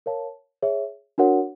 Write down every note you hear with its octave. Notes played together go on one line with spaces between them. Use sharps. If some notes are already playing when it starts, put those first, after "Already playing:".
A#4 C#5 F5 A5
G#4 C#5 E5
D4 F#4 A#4 C#5 F#5